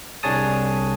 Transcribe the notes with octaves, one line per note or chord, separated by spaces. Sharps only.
C2 D4 G#4 C#5 A5 D#6